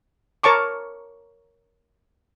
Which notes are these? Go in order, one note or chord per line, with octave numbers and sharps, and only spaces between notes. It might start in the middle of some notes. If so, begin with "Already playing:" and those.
A#4 C#5 A5 C#6 D6